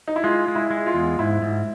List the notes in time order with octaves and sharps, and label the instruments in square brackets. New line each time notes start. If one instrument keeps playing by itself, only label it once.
[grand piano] D#4
E4
[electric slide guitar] G#3 [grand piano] F4
[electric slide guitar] G#3
[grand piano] E4
[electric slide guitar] G#3
[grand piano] F4
[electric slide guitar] E2
[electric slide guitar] G#2 [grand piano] E4
[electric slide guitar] G#2